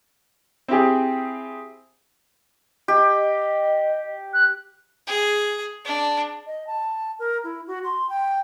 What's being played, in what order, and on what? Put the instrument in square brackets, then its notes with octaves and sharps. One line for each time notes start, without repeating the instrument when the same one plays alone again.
[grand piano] C4 E4 G4 G#4
[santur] G4 [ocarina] D#5
[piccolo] F#6
[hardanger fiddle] G#4
D4
[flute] D#5
A5
A#4
E4
F#4
C6
G5